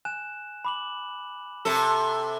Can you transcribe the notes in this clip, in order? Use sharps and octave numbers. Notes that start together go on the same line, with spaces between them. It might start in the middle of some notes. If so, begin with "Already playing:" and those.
G#5 F#6 E7
B5 D6 F#7
C3 A4